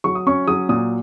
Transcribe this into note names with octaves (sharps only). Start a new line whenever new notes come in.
F#3 C#6
D#6
C#4 C#6
F#3 D#6
A#2 D#6